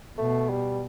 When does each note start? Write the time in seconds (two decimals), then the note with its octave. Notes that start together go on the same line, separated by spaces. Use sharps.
0.17 B2 A3
0.50 G3